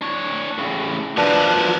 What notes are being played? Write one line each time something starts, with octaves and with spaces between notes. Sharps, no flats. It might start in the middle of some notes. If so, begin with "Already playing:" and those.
D4 C#5
A2 C#3
F3 D4 F#4 A#4 B4